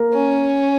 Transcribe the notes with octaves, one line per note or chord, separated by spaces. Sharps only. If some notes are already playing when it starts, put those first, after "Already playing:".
Already playing: A#3 A#4
C#4